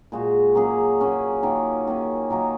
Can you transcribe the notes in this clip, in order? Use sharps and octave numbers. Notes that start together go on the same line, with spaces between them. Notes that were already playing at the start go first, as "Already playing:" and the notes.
A#2 G#3 F#4
F#3 A#3 C#4 G#4
F#3 A#3 C#4 G#4
D#3 A#3 C#4
D#3 A#3 C#4
D#3 F#3 A#3 D#4